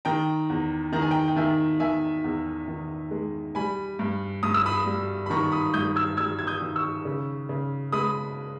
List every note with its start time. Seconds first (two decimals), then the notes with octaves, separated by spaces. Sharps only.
0.05 D#3 G5 A#5
0.49 E2
0.93 D#3 A#5
1.02 G#5
1.11 G5 A#5
1.28 G5
1.36 D#3 E5 G#5
1.80 D#3 E5 G#5
2.24 E2
2.68 D#3
3.11 G#3
3.55 G3 G#5 B5
3.99 G2
4.43 G2 D#6
4.54 E6
4.66 B5 D#6
4.86 G3
5.26 B5
5.30 D#3 A#5 C#6
5.52 B5 D#6
5.74 G2 D#6 G6
5.96 E6 G#6
6.17 G3 E6 G#6
6.39 G#6
6.47 D#6 G6
6.61 D#3
6.76 C#6 E6
7.05 C#3
7.49 C#3
7.92 G#3 B5 D#6